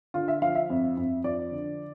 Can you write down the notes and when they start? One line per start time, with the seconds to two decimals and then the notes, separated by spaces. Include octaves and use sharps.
0.14 D3 F4
0.28 E5
0.42 F3 F5
0.55 E5
0.70 F2
0.97 F2
1.24 F3 D5
1.51 D3